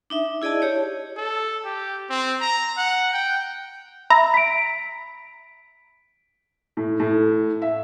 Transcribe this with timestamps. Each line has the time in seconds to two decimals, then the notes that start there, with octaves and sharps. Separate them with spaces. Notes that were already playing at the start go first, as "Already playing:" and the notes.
0.10 D4 D#4 E5
0.42 E4 G#4 D5 D#5 A5
0.62 G4 C#5
1.17 A4
1.65 G4
2.10 C4
2.41 A#5
2.78 F#5
3.13 G5
4.10 E5 A#5 B5
4.34 B6 D7
6.77 A2
7.00 A2
7.62 E5